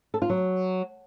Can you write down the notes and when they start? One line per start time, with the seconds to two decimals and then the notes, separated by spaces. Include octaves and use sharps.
0.14 A4
0.22 F4
0.30 F#3